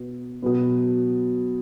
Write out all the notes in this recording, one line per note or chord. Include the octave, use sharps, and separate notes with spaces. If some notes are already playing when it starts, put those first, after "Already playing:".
Already playing: B2
B2 F#3 B3